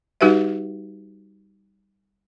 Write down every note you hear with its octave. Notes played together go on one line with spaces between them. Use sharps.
G3 D#4 F#4 G4 B4 E5